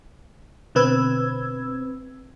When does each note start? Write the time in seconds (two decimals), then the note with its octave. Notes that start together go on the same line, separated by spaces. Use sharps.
0.75 B2 D3 C4 B4 E6 G#6